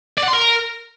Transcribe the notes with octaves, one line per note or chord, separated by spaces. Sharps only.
D5
F#5
C6
A#4